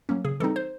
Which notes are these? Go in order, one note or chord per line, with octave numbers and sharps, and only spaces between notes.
F#3 A#3 C#4
C#3 G#4
E3 G3 C4 D#4 A4
C5